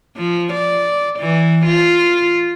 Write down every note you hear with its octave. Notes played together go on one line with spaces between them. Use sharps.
F3
D5
E3
F4